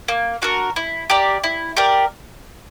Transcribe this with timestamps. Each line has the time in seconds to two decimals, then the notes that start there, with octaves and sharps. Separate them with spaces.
0.08 A#3
0.42 D4 F#4 A#4
0.76 E4
1.10 G4 A#4 D5
1.44 E4
1.77 G4 A#4 D5